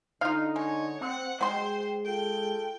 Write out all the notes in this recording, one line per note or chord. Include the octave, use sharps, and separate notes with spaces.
D3 D#4 F4 F5
G#3 C#5
C4 F#5
F#3 G#3 C5 G5 C6
F4 A4 G5